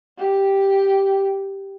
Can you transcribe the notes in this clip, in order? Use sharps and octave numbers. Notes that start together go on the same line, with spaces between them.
G4